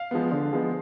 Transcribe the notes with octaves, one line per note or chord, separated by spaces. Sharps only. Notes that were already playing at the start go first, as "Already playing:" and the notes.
Already playing: F5
F3 G#3 B3
D3
F3 G#3 B3